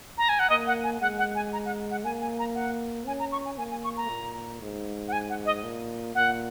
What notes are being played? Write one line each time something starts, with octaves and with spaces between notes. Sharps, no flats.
A#5
G#5
F#5
A#3 D#5
F#5
G#5
G#3 F#5
F#5
G#5
A#5
F#5
F#5
A#3 G#5
G#5
A#5
F#5
C#4 G#5
A#5
C#6
G#5
A#3 G#5
G#5
C#6
A#5
A#2
G#2
F#5
G#5
F#5
D#5
A#2
A#2 F#5